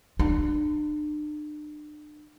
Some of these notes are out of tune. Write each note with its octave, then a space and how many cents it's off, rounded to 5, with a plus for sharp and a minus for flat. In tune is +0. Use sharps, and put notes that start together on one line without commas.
D4 +40